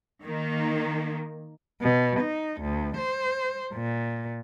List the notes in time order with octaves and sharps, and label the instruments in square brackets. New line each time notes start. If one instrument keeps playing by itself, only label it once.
[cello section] D#3 A#3
[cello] B2
D#4
D2
C5
A#2